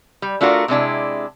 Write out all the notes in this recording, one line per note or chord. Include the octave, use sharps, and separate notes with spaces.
G3
A3 D4 F4 F#4 A#4
C3 G#3 D4 E4